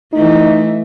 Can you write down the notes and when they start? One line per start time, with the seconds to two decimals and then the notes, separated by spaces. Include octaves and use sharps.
0.13 E3 A3 D#4